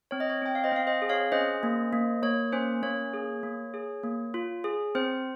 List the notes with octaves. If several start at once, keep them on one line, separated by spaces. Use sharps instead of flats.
C4 C#5
D#5
C#5
C4 G5
F5
C5 D#5
C4 F5
C5 D#5
G#4
C#5 F5
C#4 C5 D#5
A#3
A#3
A#3 C#5
C#4 C5
A#3 C#5
G#4
A#3
G#4
A#3
F4
G#4
C4 C5